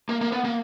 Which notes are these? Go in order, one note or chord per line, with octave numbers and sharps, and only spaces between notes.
A#3
A#3
B3
A#3